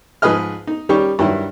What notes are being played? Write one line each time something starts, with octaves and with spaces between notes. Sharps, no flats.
G#2 F3 G#4 B4 D#5 F6
D#4
D#3 G3 C#4 D#4 G4 C#6
G2 D#3 F#3 E4